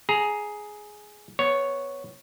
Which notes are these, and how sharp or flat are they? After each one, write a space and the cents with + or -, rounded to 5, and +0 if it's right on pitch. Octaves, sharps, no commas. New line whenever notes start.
G#4 +10 A#5 -5
B3 +0 C#5 +0